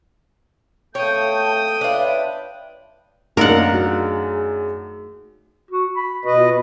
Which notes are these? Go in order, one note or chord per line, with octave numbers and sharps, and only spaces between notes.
A3 C#5 F5 G5 A5 D#6 G6
D4 F4 B4 C#5 E5
F#2 A3 A#3 D4 D#4 A#4 F5 F#5
F#4 G#4
F#4
B5
B2 F#4 B4 D#5
F4